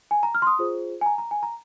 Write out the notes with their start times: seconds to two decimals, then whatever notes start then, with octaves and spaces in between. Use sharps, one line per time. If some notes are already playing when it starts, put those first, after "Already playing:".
0.11 G#5
0.23 A#5
0.35 F6
0.42 C6
0.47 D#6
0.59 F4 G#4 C5
1.01 G#5
1.06 A#5
1.18 A#5
1.31 G#5
1.43 A#5